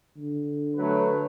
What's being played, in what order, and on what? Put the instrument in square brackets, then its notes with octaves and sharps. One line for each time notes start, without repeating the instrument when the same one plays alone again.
[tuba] D3
[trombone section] F#3 A3 B4